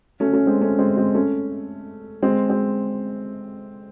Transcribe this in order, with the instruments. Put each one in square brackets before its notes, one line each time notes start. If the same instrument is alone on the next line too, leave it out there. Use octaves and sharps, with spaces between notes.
[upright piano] A3 C#4
A3 C#4
G#3 C4
A3 C#4
G#3 C4
G#3 C4
A3 C#4
G#3 C4
G#3 C4